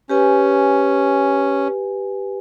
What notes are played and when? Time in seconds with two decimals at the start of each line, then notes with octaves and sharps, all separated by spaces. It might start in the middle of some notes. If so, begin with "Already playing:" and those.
0.10 C#4 G4 B4 G#5